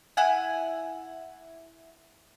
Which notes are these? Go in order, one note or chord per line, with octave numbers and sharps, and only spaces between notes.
E4 F#5 G#5